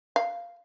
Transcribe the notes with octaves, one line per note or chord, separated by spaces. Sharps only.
F5